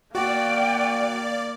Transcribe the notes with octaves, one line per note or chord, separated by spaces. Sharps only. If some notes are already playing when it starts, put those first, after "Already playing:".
A#3 F#4 D5 F5 G5